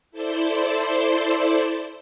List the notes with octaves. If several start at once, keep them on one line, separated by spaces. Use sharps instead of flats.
E4 A4 C5 D5 C6 E6